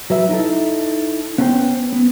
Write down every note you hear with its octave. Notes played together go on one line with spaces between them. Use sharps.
F#3 B4 E5
D#4 E4 A4
B3 C#4 E4 A4 C5 G5
B3